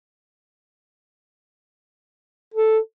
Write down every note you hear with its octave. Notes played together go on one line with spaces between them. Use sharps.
A4